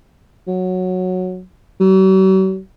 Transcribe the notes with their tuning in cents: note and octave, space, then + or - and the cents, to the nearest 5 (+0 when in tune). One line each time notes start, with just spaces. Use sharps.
F#3 -10
F#3 +45